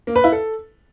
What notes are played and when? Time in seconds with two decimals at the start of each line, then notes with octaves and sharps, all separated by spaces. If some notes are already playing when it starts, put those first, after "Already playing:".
0.07 A#3
0.16 B4
0.24 E4
0.32 A4